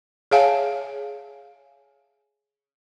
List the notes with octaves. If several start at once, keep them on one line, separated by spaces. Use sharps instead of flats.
G#4 C#5 E5 F5 G#5 A5